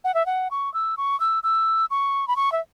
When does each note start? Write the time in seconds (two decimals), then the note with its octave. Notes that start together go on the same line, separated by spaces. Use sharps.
0.04 F#5
0.14 E5
0.26 F#5
0.51 C#6
0.74 E6
0.97 C#6
1.20 E6
1.43 E6
1.90 C#6
2.28 B5
2.36 C#6
2.52 E5